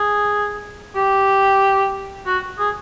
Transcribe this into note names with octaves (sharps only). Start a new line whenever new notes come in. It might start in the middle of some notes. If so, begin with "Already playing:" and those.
Already playing: G#4
G4
F#4
G#4